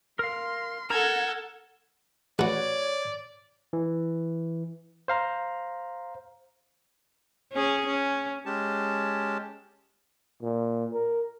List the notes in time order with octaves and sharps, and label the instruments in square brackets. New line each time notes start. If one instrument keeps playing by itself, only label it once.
[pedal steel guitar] A#4 F5 [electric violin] C6
[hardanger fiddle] A4 [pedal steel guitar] A#4 A#5 [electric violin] F#5 G#6
[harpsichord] A1 [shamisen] F#4 B4 [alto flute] C#5 [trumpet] D5
[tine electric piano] E3
C5 F5 A#5
[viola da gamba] C#4 G#4
C#4
[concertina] G#3 C#4 G4 A5
[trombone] A#2
A#4